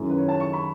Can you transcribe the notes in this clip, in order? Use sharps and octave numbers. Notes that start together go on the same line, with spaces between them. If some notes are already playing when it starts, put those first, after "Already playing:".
Already playing: F#2 D#3 G#3 C#4 E4
B4
C#5
A5
C#6
B5